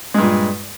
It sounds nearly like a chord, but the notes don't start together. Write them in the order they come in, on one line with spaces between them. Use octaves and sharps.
G#3 G2 A#2